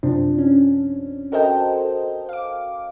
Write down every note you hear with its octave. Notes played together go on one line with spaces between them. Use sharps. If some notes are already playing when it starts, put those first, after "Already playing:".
F#2 C3 F3 C4 D4
C#4
F#4 A4 A#4 C5 D#5 G5
F5 D6